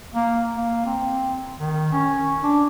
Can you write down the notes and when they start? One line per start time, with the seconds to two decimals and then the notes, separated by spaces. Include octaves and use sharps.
0.14 A#3
0.56 A#3
0.86 C4
1.60 D#3
1.92 C#4
2.43 D4